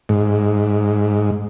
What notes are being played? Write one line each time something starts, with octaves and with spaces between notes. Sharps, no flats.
G#2